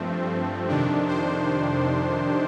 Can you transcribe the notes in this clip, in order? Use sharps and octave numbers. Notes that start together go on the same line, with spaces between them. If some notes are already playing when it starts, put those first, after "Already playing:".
Already playing: G2 F3 A3 C4
F2 C3 D#3 D4
C5